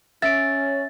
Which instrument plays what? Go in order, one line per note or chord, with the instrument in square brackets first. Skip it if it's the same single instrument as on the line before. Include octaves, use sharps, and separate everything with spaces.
[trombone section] C#4 [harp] E5 D7 [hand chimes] A6